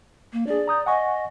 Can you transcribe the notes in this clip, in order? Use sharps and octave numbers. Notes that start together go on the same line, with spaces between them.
A#3
D4 G#4 D5
A#5 D#6 G6
D#5 F#5 G#5 C#6